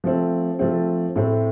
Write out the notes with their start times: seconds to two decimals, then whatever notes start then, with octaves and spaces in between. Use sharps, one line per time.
0.04 F3 A3 C4
0.59 F3 A3 C4
1.16 A2 A3 C4